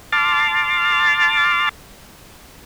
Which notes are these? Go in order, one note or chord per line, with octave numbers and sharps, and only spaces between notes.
A5 C6 D6 F6 A6